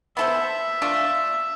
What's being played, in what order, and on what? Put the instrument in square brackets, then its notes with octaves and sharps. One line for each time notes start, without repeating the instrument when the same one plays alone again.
[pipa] B3 E4 A4 C5 [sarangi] E5
[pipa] A3 D4 F4